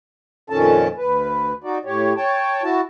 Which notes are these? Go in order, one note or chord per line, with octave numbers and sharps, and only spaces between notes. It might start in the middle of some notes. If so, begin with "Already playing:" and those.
F2 A#2 D#3 C#4 A4 A5
D2 B4
D#4 F#4 D5
A2 G4 C#5
C#5 G5 A5
E4 F#4 A5